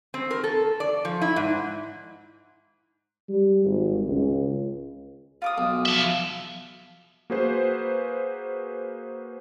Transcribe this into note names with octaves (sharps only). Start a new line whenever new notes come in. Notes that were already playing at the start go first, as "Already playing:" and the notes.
C4
A#4
A4
D5
F3
E4
G#2
G3
G#1
C#2
F4 D6 D#6
B1
F3 E5
A#3 F#4 G#4 B4 C5